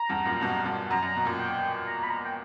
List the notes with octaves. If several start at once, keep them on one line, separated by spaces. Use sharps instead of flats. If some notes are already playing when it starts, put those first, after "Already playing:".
Already playing: A#5
E2 G2
F#2 A#2
G2 B2
G2 B2
F#2 A#5
F#2
B2
F#2 A#2
G5
A#5
B5
A#5
G5